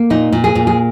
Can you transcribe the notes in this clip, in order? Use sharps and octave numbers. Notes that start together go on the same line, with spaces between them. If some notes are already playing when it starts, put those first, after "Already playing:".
Already playing: A#3
A#2 D#4
A#2
G#4
A#2
G#4